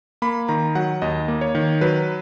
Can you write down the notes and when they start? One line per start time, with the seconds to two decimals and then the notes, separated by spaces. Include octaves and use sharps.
0.22 A#3 B5
0.48 D#3 A#5
0.75 F#3 F#5
1.02 D#2 D#5
1.28 A#3
1.41 C#5
1.55 D#3
1.81 F#3 B4